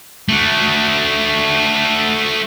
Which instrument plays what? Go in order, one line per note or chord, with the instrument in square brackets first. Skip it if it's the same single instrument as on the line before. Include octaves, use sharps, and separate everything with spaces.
[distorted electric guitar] A3 F#4